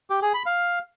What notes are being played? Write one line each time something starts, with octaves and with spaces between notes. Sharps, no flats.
G4
G#4
B5
F5